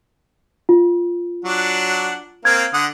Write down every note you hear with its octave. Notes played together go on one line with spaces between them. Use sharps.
F4
F#3 D4 F#5
A#3 C4 F5 G#6
D3 F#5 D#6